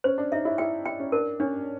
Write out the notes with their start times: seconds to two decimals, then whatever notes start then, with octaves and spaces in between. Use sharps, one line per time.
0.04 C#4 C5
0.18 D4
0.32 D#4 E5
0.45 E4
0.58 E4 G5
0.85 E4 G5
1.00 C#4
1.12 D4 A#4
1.40 C#4 D4